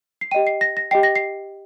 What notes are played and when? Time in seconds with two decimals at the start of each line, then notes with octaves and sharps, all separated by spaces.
0.21 C7
0.31 G4 D#5 G5 D#7
0.47 C7
0.61 A#6
0.77 A#6
0.91 G4 D#5 G5 C7
1.03 A#6
1.16 C7